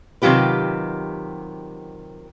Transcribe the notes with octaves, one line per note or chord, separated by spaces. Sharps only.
C3 D#3 F#3 F4 G4 B4